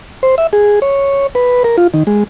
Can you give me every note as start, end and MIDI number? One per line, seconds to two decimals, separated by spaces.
0.23 0.35 72
0.38 0.47 76
0.53 0.80 68
0.82 1.27 73
1.35 1.63 71
1.64 1.77 70
1.78 1.87 65
1.94 2.03 51
2.07 2.24 56